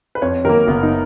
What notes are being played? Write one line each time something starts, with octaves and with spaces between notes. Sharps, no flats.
B4
F2 C#5
D#3 F#3 A#3 A#4
F#1 B3
D#4